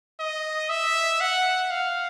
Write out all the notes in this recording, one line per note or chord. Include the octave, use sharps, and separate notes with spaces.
D#5
E5
F#5
F5